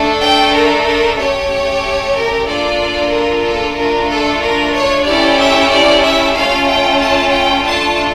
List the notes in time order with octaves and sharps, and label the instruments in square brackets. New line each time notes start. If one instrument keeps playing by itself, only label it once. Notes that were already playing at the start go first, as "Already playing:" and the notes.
Already playing: [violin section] A3 D4 A4
G5
A#4
A#4
A3 C#4 G4 C#5
A#4
A#3 D4 F4 A4 D5
A#4
A4
A3 D4 F4 A#4
A4
A#4
C#5
A3 C#4 E4 G4 D5
E5
D5
E5
A3 C#4 F4 F5
G5
A5
G5
A3 D4 F4 A4 A5